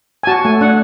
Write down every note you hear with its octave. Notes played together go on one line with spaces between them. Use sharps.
G#5
F#4 A5
A3 G#5
D4 F#5